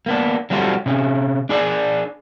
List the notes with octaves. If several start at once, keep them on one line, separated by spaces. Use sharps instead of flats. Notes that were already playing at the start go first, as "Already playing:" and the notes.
A#3 B3 D4
F#3 G3 C4 F4 F#4 A4
C3 C#4
D4 G#4 D5